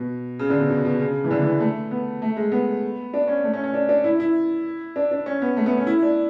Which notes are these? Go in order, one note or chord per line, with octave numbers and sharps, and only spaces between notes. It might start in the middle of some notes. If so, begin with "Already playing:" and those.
Already playing: B2
C#3
D3
B2
B2
B2
C#3
E3
D3
E3
A3
B3
A3
G#3
B3
D4
C#4
A3
C#4
C#4
D4
D4
E4
E4
D4
D4
C#4
B3
A3
B3
C#4
E4
D4